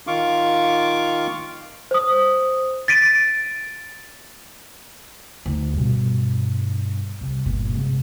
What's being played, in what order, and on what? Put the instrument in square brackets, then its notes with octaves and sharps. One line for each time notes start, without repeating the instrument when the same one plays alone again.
[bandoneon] D#3 F4 F5 C#6 D6
[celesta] C5 D#6
A6 B6 D7 D#7
[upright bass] D2 D#4
G2 B2
C2
G1 A#2
G#2 C3